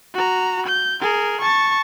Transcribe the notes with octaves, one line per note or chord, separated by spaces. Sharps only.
F#4 A#5
G6
G#4 A#4
A5 C#6